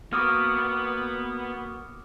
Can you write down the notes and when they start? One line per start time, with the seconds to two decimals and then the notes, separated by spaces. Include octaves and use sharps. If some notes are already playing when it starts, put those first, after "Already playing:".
0.13 A#3 B3 F#4 B4 D6 D#6 F6